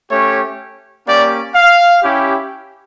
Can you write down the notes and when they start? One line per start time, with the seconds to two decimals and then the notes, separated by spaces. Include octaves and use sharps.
0.11 A3 C#4 G4 C#5
1.06 A#3 C#4 G4 D5
1.55 F5
2.02 C#4 E4 G4